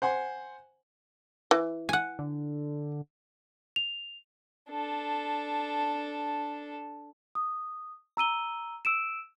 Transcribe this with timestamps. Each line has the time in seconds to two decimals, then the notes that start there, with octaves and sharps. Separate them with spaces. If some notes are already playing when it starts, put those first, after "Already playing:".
0.02 C5 F#5 G#5 C6
1.51 E3
1.89 F#5 G#5
2.19 D3
3.76 F7
4.70 D4 A4
7.35 D#6
8.17 A#5 E6 D#7 G7
8.85 E6 D7 E7